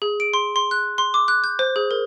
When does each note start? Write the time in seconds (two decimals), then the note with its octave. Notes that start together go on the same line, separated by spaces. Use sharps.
0.02 G#4
0.20 D7
0.34 C6
0.56 C6
0.71 F#6
0.98 C6
1.14 D6
1.28 F#6
1.44 G6
1.59 C5
1.76 G#4
1.91 A#4